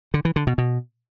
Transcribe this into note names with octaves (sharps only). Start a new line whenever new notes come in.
D3
E3
D3
B2
B2